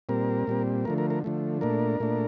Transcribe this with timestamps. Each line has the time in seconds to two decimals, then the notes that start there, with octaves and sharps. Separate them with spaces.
0.09 A#2 G3 C4 A#4
0.47 A#2 G3 C4
0.85 D3 F3 A3 A#4
0.98 A#4
1.10 A#4
1.24 D3 F3 A3
1.61 A#2 A3 D4 A#4
2.00 A#2 A3 D4